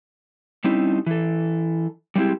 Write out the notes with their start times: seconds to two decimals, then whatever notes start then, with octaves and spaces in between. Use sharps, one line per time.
0.64 G3 C4 C#4 D#4 E4
1.06 E3 A4
2.16 G3 G#3 C4 E4 G4